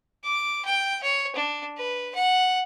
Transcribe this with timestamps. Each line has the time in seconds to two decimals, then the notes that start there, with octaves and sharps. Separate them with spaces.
0.24 D6
0.65 G5
1.03 C#5
1.36 D4
1.77 B4
2.15 F#5